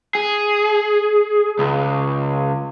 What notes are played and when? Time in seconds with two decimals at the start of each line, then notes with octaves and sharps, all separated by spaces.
0.15 G#4
1.59 C#2